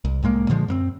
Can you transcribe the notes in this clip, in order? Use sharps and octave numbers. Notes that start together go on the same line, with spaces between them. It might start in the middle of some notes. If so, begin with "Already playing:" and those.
C2
C2 A2 G#3 A#3
A#2 D3 F3 G#3
F#2 A#3 C4